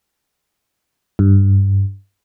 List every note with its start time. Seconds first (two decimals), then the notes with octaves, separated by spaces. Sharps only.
1.19 G2